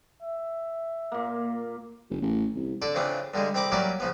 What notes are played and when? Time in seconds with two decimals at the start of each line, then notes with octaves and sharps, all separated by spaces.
0.22 E5
1.12 A#2 A#3
2.10 F#1
2.22 A1
2.55 C2
2.82 D3 A4 D5
2.95 C#3 E3 C4 D4 F4
3.34 G2 D3 G3 G#3
3.54 C2 C4 A#5 B5 D6
3.72 F#3 G3 A#3 C#4 E4 D5
4.00 C#3 F3 B3